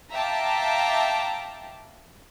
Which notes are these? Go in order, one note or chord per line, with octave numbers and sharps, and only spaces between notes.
E5 F5 G5 A5 A#5 D6